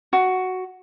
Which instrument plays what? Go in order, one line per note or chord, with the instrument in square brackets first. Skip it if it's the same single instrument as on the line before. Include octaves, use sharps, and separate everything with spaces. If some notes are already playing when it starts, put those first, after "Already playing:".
[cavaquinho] F#4